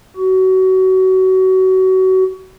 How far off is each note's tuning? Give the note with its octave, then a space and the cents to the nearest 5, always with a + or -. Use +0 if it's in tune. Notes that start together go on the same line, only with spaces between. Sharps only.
F#4 +25